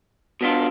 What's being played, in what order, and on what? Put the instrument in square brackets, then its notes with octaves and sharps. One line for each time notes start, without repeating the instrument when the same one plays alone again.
[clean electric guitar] B2 B3 D4 F4